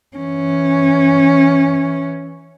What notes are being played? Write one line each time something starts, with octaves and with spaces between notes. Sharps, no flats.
E3 C#4